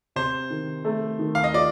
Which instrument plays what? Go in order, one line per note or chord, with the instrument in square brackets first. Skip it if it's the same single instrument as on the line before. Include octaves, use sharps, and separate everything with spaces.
[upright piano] C3 [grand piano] C5
[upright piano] D#3
A3
D#3
[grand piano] F5
D#5
[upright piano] F4 [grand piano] D5